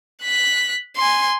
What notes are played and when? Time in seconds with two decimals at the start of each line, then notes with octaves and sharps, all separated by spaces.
0.23 F#6 B6
0.97 G#5 C6